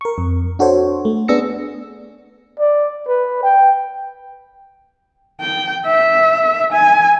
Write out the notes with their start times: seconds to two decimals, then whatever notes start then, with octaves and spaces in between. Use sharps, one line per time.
0.01 A#4 C#6
0.18 F2
0.59 D4 F#4 A4 C5 C#5
1.05 A3
1.28 B3 D4 G#4 E6 A#6 C#7
2.60 D5
3.08 B4
3.43 G5
5.41 G5
5.86 E5
6.73 G#5